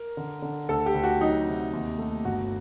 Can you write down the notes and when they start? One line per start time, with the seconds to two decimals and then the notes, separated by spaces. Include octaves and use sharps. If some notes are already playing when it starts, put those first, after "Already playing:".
Already playing: A#4
0.17 D3
0.42 D3
0.69 D2 A4
0.86 G4
0.95 D2
1.03 F#4
1.21 F#3 D#4
1.46 C3
1.73 D#2
1.98 A3
2.25 G1 F#4